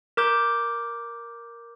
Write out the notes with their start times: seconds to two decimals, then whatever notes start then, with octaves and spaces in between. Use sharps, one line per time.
0.17 A#4 D6 G6